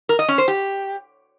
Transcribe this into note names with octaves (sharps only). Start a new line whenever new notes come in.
A#4
D#5
C#4
C5
G4